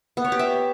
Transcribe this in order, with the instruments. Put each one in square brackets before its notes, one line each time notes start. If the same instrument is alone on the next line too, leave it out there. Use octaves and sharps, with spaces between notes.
[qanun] B3
C#5
G4
E5